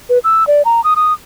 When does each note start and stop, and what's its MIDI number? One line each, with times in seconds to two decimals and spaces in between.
0.09 0.19 71
0.24 0.47 88
0.47 0.62 74
0.65 0.83 82
0.84 0.94 87
0.96 1.13 87